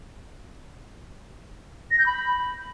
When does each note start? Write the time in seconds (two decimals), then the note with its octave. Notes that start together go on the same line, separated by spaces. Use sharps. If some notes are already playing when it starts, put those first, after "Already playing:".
1.91 A#6
1.99 G6
2.06 B5